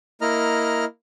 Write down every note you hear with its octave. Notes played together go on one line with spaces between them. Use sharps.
A#3 E4 D#5 A#5 F6